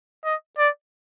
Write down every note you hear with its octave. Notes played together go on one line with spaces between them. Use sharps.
D#5
D5